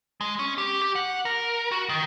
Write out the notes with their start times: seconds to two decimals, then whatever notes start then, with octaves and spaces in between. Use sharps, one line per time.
0.21 G#3
0.39 C#4
0.58 G4
0.82 G4
0.95 F#5
1.25 A#4
1.72 F#4
1.89 D#3